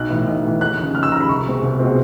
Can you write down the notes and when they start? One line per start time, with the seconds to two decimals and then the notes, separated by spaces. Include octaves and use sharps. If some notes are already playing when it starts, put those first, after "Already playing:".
Already playing: B1 F#6
0.09 A2 E3
0.27 B1
0.44 A2 E3
0.61 D#2 F#6
0.77 C#3 F3 F#6
0.95 D#2 F6
1.03 E6
1.12 C#3 F3 A#5
1.20 B5
1.29 C2 C#6
1.46 B2 G#3 C4
1.62 C2
1.79 B2 G#3 C4